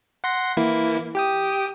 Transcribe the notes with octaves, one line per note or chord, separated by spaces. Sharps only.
F#5 C6 A#6
E3 A#3 E4
G4 G5 D#6